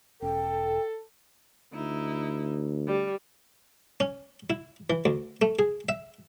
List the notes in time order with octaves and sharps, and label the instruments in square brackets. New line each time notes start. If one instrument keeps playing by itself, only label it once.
[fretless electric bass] E1 C#4 [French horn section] A4 [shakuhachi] G5
[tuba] D2 [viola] D#4 E4
[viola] G3
[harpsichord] C#4
E4
E3
D2
A3
G#4
E5